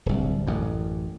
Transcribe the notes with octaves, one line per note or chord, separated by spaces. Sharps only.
D1 C2
A1 F#2